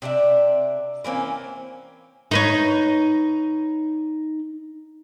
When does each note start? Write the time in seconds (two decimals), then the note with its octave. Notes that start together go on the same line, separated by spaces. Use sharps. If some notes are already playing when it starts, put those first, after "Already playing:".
0.02 C3 D4 D5 E5
1.04 E3 A#3 C4 C#4
2.31 D#4 B4 C#5